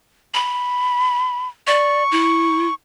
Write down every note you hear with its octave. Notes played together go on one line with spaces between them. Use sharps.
B5
D5 C#6
E4